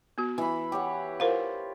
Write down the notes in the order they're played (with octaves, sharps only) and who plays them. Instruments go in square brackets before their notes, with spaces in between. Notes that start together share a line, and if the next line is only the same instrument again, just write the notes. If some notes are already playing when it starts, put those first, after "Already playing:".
[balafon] B3 F#4
[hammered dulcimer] E3 B5
G4 C#5 F#5
[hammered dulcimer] F4 [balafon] A#4 C5 F5